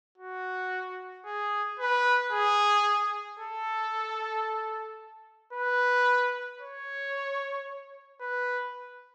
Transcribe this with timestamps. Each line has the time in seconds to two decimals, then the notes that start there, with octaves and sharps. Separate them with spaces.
0.18 F#4
1.26 G#4
1.80 B4
2.32 G#4
3.39 A4
5.53 B4
6.61 C#5
8.21 B4